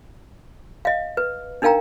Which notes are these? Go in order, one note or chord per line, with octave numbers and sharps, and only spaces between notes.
D#5 F5
B4
D4 D#4 A#4 F5 G5 A#5